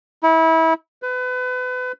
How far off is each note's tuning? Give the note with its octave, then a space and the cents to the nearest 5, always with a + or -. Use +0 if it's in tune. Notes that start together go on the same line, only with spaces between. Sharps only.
E4 -25
B4 +30